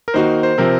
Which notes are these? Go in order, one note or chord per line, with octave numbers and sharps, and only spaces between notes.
A#4
D#3 A#3 D#4 F#4 C5
C5
C3 F3 C4 A#4